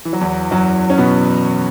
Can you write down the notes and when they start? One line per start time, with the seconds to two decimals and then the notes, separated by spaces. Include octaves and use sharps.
0.05 E3
0.13 F#3
0.21 E2 E3
0.51 F#2 F#3
0.90 C#4
0.98 B2 B3